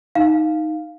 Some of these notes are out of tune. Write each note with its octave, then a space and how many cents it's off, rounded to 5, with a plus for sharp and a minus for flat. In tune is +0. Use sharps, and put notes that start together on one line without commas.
D#4 +5 F5 +0